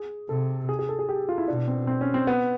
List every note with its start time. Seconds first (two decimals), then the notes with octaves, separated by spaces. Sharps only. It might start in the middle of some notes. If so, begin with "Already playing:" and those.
Already playing: G#4
0.29 C3 A4
0.69 G#4
0.79 G#4
0.89 A4
0.99 G#4
1.09 G4
1.29 F4
1.38 E4
1.48 B2 D4
1.68 C4
1.87 C4
2.01 C#4
2.14 C4
2.27 B3